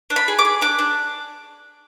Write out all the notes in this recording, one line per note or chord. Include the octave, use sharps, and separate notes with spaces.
D4
B5
G#4
D6
G#4
D4 D6
D4